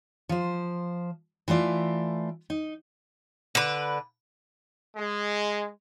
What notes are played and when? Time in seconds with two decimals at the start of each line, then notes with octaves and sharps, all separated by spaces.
0.29 F3 C5
1.48 E3 A3 F4 D5
2.50 D#4
3.55 D3 B4
4.96 G#3